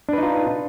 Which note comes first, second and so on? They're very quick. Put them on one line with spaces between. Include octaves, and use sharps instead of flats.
D4 B4 D#4 F4